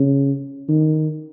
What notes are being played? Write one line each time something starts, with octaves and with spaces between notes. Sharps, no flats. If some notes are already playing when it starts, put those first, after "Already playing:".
Already playing: C#3
D#3